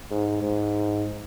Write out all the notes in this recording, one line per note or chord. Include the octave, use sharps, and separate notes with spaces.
G#2
G#2